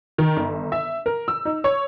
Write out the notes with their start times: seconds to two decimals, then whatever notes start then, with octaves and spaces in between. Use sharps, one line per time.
0.18 D#3
0.37 G1
0.72 E5
1.06 A#4
1.28 E6
1.45 D#4
1.64 C#5